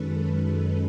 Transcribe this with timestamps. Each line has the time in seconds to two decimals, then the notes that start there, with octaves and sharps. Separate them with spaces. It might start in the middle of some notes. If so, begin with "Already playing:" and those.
Already playing: F#2 D#3 G#3 C#4 A4 B4